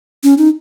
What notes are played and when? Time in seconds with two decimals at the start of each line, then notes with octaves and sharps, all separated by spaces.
0.23 C#4
0.38 D#4